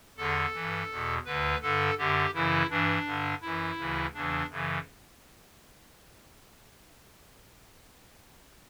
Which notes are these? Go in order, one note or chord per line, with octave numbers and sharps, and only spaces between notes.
E2 D3 A4
G2 E3
E2 B2
D2 D3 B4
G2 D3 A4
F#2 D3 G4
F#2 C#3 E3 E4
G2 E3 D4
G2 D3
F#2 E3 E4
D2 C#3 E3
E2 C#3 E3 D4
F#2 C#3 E3